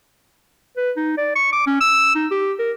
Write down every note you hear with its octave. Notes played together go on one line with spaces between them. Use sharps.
B4
D#4
D5
C#6
D6
C#4
E6
D#4
G4
A#4